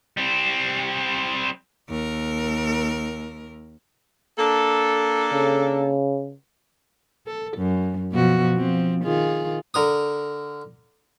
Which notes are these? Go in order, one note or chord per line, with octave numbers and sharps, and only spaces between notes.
G3 C4
D#2 A#4
A#3 D4 A4
C#3
A4
F#2
B2 F3 F#4
F3 C4
D#3 F4 G#4
D3 A#4 D#6